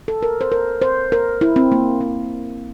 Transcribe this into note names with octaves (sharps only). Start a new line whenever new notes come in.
A4
A#4
C5
A#4
C5
A#4
E4
C4
A#3
C4